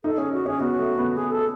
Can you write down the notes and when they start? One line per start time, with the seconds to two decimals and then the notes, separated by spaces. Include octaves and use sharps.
0.04 D#4 A4
0.18 C#4 G#4
0.32 F#4
0.46 C#4 G#4
0.60 B3 F#4
0.79 A3
0.98 B3
1.17 G#4
1.31 A4